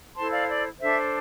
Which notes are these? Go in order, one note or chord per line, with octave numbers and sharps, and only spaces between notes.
E4 A4 C5 A5 C6
D5 F5
D5
D4 A4 C5 E5